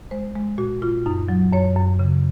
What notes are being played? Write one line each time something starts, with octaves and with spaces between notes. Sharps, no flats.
G#3 C5
G#3
A#2 F#4
A#2 F4
F#2 D#4
F#3
F#2 C#5
F#2
C#3